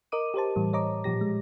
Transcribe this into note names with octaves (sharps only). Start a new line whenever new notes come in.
A#4 D#5 D6 D#7
G4 A#4 C5 A5
A2 E3 G3
C#5 D#5 A#5 D6
A#2 F3 G4 A#6
G#3